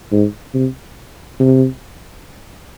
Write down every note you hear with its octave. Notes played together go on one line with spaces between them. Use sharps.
G#2
C3
C3